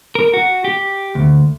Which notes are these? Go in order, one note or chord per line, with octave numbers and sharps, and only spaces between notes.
A#4
F#4
G4
D2